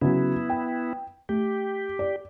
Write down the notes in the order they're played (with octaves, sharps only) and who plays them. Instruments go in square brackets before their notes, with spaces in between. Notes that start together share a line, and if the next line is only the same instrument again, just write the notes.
[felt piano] C#3 F#3 [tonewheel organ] B3 E4
[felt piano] G5
[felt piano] A3 [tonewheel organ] G4
[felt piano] D5